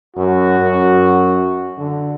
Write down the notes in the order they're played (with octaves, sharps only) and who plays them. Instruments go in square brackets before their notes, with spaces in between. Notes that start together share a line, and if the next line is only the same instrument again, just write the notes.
[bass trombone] F#2 [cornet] F#4
[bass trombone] F#2
D3